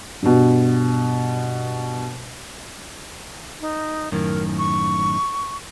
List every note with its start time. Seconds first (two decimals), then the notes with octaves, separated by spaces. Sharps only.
0.22 G2 B2
3.61 D#4
4.12 F#2 A2 D#3 A#4
4.58 C#6